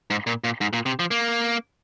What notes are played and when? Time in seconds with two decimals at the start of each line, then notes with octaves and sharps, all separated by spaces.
0.10 G#2
0.27 A#2
0.44 A#2
0.61 G#2
0.73 A#2
0.86 C3
0.99 F3
1.11 A#3